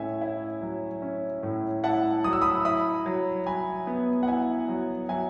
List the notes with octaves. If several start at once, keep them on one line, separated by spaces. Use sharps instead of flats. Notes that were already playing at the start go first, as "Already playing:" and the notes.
Already playing: A2 C#4 E5 G#5
E4
F#3
C#4
A2
E4 F#5 A5
F#3 D#6
E6
B5 D#6
E4 B5 D#6
F#3
F#3 G#5 B5
B3
F#5
E4 E5 G#5
F#3
F#3 E5 G#5